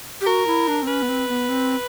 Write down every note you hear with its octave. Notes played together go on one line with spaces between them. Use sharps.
G4
F#4 A#4
E4
D4
C4
C#4 B4
B3
C4
B3
C4